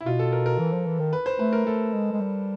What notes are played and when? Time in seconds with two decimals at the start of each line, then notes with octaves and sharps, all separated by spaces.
0.01 E4
0.06 B2 F4
0.19 A4
0.32 A#4
0.46 A#4
0.59 E3
0.73 F3
0.86 E3
0.99 D#3
1.13 B4
1.26 C5
1.39 A3 B4
1.53 A#4
1.66 A3 A4
1.93 G#3
2.13 G#3
2.20 G3